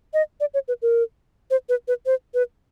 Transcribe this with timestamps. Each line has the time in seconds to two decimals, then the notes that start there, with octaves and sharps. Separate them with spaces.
0.14 D#5
0.40 D5
0.54 C#5
0.68 B4
0.82 A#4
1.51 C5
1.69 B4
1.88 B4
2.06 C5
2.34 B4